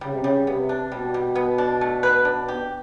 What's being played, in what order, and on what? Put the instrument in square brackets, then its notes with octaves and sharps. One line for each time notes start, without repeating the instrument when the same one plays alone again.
[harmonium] C#3 [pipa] G3
[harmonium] C3
C#3
[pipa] G3
[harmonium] C3 [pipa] B3
[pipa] D4
[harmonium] B2 [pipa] G3
[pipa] G3
B3
D4
A3
B4
D4
G4